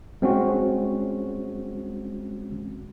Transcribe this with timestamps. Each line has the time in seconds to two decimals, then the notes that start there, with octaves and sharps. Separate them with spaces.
0.22 G#3 C4 C#4 F#4